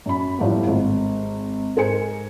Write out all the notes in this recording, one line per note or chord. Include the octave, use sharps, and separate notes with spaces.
F#2 B5
A2 F3 G3 A3 B3
G#1
G#2 A#4 C5 G#5 C#7